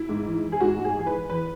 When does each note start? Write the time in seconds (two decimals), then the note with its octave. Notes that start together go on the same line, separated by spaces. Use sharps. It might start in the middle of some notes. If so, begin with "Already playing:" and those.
Already playing: E4
0.09 G#2
0.26 E3
0.44 E3
0.52 G#4
0.60 G#2 F#4
0.79 G#2
0.84 G#4
0.95 E3 G#4
1.07 B4
1.13 E3
1.30 E2 B4